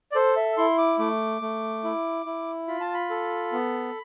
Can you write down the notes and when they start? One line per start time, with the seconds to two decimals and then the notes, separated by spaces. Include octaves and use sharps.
0.12 D5
0.15 A4 C5
0.36 E5
0.57 E4 C6
0.78 D6
0.99 A3 D6
1.41 A3
1.84 E4
2.26 E4
2.68 F4 B5
2.80 A5
2.94 B5
3.10 A4
3.52 B3